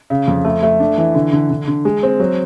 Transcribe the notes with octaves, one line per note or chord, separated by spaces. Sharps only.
C#3
F2
A3
A3
D4
E3
D3
D3
D3
D3
G#3
C4
F#3